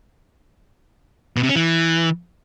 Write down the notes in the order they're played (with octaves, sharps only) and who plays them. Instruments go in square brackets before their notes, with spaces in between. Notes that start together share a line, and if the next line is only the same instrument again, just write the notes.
[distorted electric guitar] B2
C3
C#4
E3